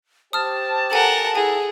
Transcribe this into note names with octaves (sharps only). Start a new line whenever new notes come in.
G4 C5 A5 D#6 F6
A4 A#4 F#5 G#5
E4 G#4 A4 G#5